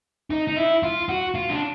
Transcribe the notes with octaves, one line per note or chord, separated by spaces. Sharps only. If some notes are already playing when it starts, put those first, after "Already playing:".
D#4
D#4
E4
F4
F#4
F4
D4